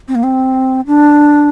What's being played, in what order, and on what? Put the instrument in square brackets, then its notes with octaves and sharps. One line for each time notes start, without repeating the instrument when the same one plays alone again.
[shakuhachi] C4
A#3
C4
D4